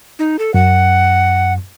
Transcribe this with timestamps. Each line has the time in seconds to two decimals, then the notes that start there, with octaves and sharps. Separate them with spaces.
0.19 D#4
0.39 A4
0.54 F#2 F#5